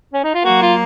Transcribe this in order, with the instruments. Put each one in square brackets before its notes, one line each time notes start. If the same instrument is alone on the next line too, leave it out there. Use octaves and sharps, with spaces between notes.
[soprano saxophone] C#4
D#4
F4
[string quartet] F#3 A#3 [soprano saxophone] F#4
[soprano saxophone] F4